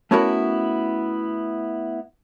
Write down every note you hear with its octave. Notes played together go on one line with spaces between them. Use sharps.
A3 B3 C#4 E4 F#4 A#4